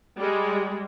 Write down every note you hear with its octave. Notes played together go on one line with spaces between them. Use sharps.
G3 G#3